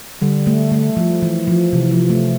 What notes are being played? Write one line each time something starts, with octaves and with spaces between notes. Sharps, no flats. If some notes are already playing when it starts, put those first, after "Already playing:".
D3 G3
A3
A3
F3
E3
F3
C3 E3
F3
A3